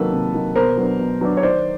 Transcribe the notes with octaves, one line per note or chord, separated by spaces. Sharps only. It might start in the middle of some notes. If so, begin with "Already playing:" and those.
Already playing: C3 D#3 F#3 A#3 A4 B4
C3
D#3 F#3 A#3
B2 A#4 C5
F#3 B3 D4
B2
F#3 B3 D4
C#5
D#3 C5 D5